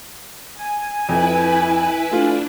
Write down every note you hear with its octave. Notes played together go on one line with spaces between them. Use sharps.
G#5
F2 E4 B4
A3 D4 F4